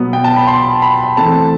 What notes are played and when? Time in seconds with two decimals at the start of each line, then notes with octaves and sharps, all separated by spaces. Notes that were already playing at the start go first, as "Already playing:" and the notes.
Already playing: B2 F#3 B3
0.13 G5
0.24 A5
0.36 B5
0.47 C6
0.82 B5
1.17 E3 A3 C4 A5